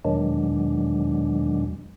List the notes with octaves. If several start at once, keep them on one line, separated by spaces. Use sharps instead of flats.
E2 B2 D#3 F#3 G#3 D4